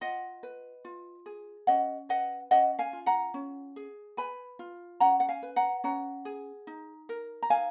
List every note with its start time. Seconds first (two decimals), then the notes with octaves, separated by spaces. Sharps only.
0.01 F4 D#5 F#5
0.43 B4
0.85 F4
1.26 G#4
1.67 C#4 D#5 F#5
2.09 B4 D#5 F#5
2.51 C#4 D#5 F#5
2.79 F5 G#5
2.93 F4
3.06 F#5 A#5
3.34 C#4
3.76 G#4
4.17 B4 G#5 B5
4.59 F4
5.00 C#4 F#5 A#5
5.20 F#5
5.29 F5 G#5
5.43 B4
5.56 F#5 A#5
5.84 C#4 F#5 A#5
6.25 G#4
6.67 D#4
7.09 A#4
7.43 A#5
7.50 D#4 F5 G#5